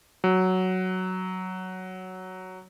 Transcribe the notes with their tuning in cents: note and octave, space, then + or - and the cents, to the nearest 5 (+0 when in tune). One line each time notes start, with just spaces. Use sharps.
F#3 +5